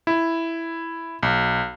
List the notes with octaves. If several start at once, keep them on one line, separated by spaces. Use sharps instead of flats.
E4
B1